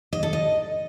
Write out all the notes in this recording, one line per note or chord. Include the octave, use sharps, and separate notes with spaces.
D#5
A4
D#5